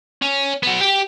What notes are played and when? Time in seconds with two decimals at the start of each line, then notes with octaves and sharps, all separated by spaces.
0.22 C#4
0.63 F#3 B3
0.81 G4 G5